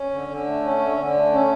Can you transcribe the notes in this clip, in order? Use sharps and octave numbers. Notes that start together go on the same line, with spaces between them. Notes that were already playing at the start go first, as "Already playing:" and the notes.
Already playing: C#4
D3
D3
A3
C#4
D3
D3
A3
C#4